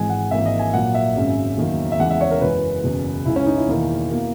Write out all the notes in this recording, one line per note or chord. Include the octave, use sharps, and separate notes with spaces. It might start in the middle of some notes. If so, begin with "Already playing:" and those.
Already playing: G#1 G#2 E3 G#3 G#5
F#5
G#1 G#2 E3 A#3 E5
D#5
G#5
A#1 A#2 F#3 A#3 F#5
E5
G#1 F#2 C#3 G#3
F#1 E2 D#3 F#3 A#3
E5
E2 C#3 E3 G#3 F#5
E5
C#5
A#4
F#1 F#2 E3 G#3 B4
F#1 E2 B2
C#2 C#3 G#3 E4
C#4
D#4
E4
E1 E2 D#3 A#3
B2 A#3